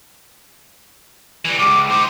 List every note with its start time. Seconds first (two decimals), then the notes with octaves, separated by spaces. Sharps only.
1.45 E3 G3
1.59 C#2 D6
1.91 D#4 C5 D6